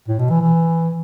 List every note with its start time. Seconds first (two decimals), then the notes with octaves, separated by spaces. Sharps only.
0.08 A2
0.19 B2
0.30 E3
0.41 E3